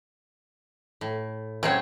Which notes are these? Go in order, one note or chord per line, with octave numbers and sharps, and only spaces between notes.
A2
C#3 F#3 C4 C#5